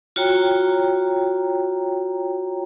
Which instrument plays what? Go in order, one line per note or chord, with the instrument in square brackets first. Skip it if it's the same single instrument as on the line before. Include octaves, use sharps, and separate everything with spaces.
[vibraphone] F4 F#4 C#5 G5 A#5